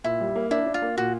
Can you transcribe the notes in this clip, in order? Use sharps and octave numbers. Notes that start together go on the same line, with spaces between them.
A#2 E4
G3
A#3
D4 E4
D4
F4
A#3
A#2 F#4